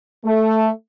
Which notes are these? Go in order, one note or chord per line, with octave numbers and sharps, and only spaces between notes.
A3